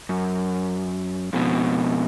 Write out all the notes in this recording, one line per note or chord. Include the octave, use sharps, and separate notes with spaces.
F#2
F2 B2